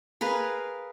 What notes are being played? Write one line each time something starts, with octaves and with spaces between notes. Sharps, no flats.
G#4 A#4 B4 F5